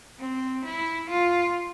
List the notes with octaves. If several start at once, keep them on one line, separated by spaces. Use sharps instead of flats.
C4
E4
F4